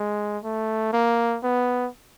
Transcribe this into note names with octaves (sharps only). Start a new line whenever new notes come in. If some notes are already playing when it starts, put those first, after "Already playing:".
Already playing: G#3
A3
A#3
B3